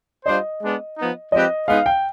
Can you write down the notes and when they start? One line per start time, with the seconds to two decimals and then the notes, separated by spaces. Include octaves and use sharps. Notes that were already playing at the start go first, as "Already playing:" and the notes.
0.26 G3 D4 F4 C5 D#5
0.61 G#3 B3 D4
0.97 F3 B3 D#4
1.32 F3 G#3 C4 G4 B4 D#5
1.68 G#3 B3 D#4 B4 F5
1.86 G5